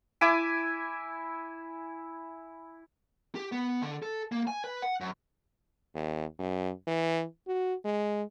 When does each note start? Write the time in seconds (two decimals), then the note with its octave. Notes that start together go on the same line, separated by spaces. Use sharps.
0.21 E4 E5 G#5 D6
3.35 G4
3.52 B3
3.82 D3
4.02 A4
4.32 A#3
4.47 G#5
4.64 B4
4.82 F#5
5.01 F#2
5.95 D#2
6.39 F#2
6.87 E3
7.48 F#4
7.85 G#3